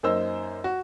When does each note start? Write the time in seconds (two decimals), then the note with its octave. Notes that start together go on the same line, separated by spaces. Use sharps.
0.03 F#2 A#3 D#4 C5 E6
0.64 F#4